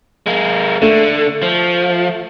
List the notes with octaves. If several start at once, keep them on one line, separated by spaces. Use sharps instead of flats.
G#3 A#3
D3 A3
F3